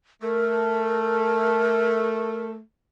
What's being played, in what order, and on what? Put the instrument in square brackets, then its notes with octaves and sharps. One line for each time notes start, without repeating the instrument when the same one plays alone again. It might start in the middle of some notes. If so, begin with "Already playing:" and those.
[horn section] A3 [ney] A#4